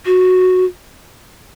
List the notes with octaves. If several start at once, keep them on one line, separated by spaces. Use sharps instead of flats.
F#4